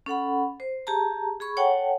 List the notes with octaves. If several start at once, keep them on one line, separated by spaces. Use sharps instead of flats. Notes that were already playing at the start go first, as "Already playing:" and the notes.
C#4 A4 F#5 B5
C5
G4 G#4 A5 A#5
G#4 B5 C#6
A4 C#5 F#5 G5 A5